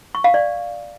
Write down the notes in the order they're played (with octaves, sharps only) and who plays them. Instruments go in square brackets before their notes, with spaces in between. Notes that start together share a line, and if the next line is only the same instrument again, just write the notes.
[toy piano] C#6
F5
D5